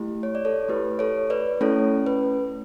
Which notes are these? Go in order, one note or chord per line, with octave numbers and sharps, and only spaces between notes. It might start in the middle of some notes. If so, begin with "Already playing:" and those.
Already playing: A3 E4 G4
C#5
D5
A4 C#5
A3 E4 G4 B4
A4 C#5
B4 D5
A3 C#4 E4 A4 C#5
B4